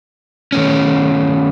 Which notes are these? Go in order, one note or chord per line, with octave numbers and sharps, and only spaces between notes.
D#3 A3 C#4